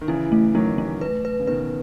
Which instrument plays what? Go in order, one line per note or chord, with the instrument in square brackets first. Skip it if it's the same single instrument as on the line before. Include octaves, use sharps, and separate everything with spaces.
[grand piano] D#3
[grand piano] C#3 E3 [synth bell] E4
[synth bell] A3
[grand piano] D#3 F#3 [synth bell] A3
[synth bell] A3
B4
B4
[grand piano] C#3
[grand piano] B2 D#3 [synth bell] B4